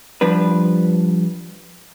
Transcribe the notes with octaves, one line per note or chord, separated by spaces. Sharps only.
F3 G3 D4 B4